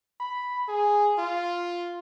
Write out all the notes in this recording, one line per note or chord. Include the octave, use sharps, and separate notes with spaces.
B5
G#4
F4